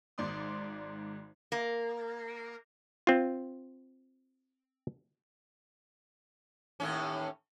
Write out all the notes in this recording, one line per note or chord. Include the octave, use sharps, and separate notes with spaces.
G#1 G#2 D5 C6 D#6
A#3
C4 F4
D#2 A2 C#4